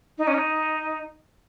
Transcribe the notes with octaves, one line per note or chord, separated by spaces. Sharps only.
D#4
C#4
D#4